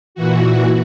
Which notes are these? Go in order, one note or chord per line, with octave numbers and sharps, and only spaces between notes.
A#2 E3 F#4